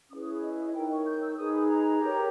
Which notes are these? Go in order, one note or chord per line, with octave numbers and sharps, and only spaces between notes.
C#4 E4 G#4 B4 D#6
D#6
D#5
D#5
D#5
D#4 A#4 C#5 G5
C#6
G6
E6
D#4 G#4 B4 D#6
B5
A#5
G4 A#4 C#5